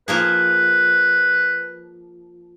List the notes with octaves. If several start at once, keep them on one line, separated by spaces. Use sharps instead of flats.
F3 A#3 G#4 B4